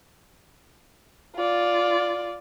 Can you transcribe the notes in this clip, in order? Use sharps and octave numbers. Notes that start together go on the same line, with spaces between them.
F4 D5